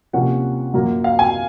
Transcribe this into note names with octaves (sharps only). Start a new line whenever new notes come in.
C3 F3 A#3 C#4 F#5
F#2 F3 A#3
F5
G#5